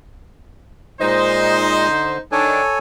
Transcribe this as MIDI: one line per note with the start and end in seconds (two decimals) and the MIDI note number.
1.01 1.88 46
1.01 1.88 56
1.01 2.19 63
1.01 2.19 72
1.01 1.88 75
1.89 2.18 50
2.32 2.61 51
2.32 2.61 62
2.32 2.79 69
2.32 2.79 73
2.32 2.79 80